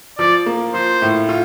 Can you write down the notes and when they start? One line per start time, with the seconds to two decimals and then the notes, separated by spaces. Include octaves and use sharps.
0.19 F3 D5
0.46 A#3
0.74 F3 C5
1.02 A2
1.29 F4